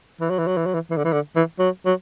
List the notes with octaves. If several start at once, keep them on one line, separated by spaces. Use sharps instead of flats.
E3
F#3
E3
F#3
E3
F#3
E3
E3
D3
E3
D3
E3
F#3
F#3